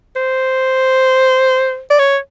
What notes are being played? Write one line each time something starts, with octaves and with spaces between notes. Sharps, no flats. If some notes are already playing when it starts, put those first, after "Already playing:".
C5
D5
C#5